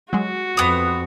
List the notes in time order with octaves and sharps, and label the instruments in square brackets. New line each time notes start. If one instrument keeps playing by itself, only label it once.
[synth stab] F#3 G#3 [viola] F#4
[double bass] F2 [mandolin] B3 D#6